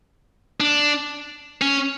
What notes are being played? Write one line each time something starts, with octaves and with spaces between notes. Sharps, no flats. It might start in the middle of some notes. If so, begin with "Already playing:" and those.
D4
C#4